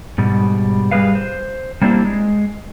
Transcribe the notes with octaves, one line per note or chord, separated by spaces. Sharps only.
G#2 B2 G3
G3 G4 G#4 B4 F5
C5
G3 A#3 C4 D4 E4 G4
G#3